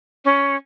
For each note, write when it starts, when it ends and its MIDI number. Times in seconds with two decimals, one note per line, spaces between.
0.25 0.56 61